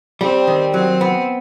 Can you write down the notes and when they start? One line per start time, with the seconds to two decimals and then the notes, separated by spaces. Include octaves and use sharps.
0.21 G3 C4
0.47 D#3
0.74 F#3 C4
1.01 B3